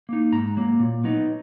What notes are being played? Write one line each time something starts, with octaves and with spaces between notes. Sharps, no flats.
A#3 D#4
G#2 A#5
F#3 A#3
A#2
F#3 B3 D#4